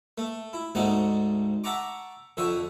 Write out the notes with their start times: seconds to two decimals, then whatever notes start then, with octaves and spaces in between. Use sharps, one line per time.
0.18 A3
0.53 E4
0.75 D2 G#2 A3 D#4 F#5 A5
1.64 E5 F#5 A5 A#5 C#6 D6
2.37 F2 D3 E5 C#6